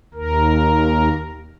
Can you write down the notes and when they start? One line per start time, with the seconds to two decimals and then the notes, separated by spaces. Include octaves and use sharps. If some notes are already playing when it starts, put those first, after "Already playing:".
0.14 D#2 A#4